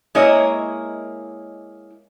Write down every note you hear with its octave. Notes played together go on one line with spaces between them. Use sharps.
G#3 A#3 E4 A#4 C#5 D#5